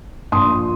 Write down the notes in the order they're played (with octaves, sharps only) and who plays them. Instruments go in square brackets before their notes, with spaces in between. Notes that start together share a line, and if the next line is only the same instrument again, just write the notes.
[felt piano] A#1 A#2 C6 D#6